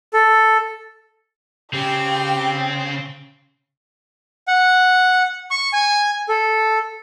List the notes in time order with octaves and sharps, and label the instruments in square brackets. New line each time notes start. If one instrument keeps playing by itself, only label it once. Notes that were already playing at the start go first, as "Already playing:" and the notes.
[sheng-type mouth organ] A4
[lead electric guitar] C#3 [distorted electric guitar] C4 [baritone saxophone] G4 [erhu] G5
[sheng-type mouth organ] F#5
C#6
G#5
A4